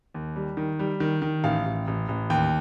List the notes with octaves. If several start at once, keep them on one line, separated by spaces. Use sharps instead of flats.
D#2
G3
D#3
G3
D#3
D#3
A1 F5
A1
A1
A1
D#2 G5